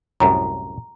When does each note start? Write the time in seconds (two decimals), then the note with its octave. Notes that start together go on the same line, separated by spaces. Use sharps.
0.20 C2 F#2 A2 A#5